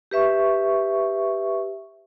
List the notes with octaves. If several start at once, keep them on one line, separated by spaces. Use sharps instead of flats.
G4 B4 E5 C#6